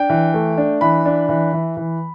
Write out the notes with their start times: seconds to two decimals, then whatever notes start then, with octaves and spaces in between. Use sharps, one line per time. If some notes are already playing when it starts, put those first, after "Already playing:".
Already playing: D4 G5
0.10 E3
0.34 A3
0.57 D4
0.81 E3 B5
1.05 D4
1.29 E3
1.53 E3
1.77 E3